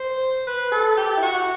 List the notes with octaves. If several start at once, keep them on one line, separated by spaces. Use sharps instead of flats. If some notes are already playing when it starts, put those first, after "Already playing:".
Already playing: C5
B4
A4
G4
E4
F#4